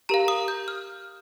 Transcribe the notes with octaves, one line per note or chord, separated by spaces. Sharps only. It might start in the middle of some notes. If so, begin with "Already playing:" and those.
G4 A#4 F5 A#5
D#6
G6
F6